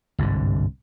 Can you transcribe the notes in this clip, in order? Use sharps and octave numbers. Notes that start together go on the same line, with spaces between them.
G1 C2 G#2 D3